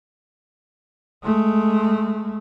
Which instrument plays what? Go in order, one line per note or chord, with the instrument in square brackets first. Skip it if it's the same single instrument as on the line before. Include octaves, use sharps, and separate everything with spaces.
[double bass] G#3 A3